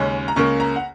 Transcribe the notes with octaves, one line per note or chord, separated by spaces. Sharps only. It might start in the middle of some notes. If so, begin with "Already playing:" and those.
Already playing: D#2 C#3 G#3 C#4
A#5
C#2 C#3 A#3 C#6
A#5
F#5